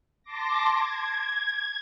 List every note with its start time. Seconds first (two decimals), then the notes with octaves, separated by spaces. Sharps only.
0.23 A5 C6 D6 A#6
0.69 G#6